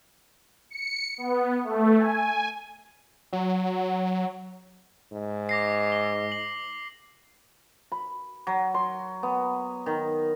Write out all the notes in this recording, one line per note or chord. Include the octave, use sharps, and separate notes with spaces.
C#7
B3
A3
G#5
F#3
G#2
D6 A#6 C7
G7
F#7
B5
F#3
C6
B3
D#3